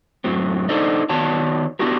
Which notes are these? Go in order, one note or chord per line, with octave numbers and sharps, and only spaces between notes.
F#2 A2 F#3 C4
D4 D#4 A4 C5 D5 D#5
D#3 B3 F#4 C#5 D5 A5
B3 D4 E4 F#4 G4 A#4